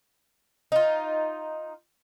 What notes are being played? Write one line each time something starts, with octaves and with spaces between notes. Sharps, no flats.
D#4 F4